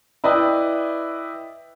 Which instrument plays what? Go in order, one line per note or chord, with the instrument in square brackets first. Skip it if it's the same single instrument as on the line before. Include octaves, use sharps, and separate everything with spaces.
[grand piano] E4 B4 D5 D#5 G5 D#6